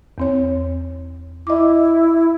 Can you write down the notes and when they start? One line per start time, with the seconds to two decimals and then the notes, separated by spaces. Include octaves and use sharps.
0.18 E2 C4 C#5
1.47 E4 D#5 D6